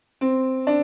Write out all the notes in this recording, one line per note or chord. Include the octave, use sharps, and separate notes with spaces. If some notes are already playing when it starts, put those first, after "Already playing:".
C4
D4